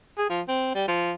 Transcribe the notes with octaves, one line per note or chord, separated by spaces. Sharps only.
G#4
F3
C4
G3
F3